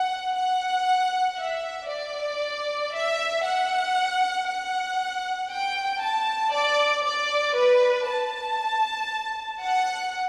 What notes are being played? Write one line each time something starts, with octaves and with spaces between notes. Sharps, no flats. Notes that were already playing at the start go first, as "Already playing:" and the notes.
Already playing: F#5
F#5
E5
D5
E5
F#5
F#5
G5
A5
D5
D5
B4
A5
F#5